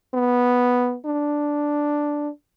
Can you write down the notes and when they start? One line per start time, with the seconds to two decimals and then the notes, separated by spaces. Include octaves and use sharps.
0.14 B3
1.05 D4